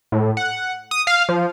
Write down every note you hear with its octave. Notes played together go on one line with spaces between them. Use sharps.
A2
F#5
D#6
F5
F3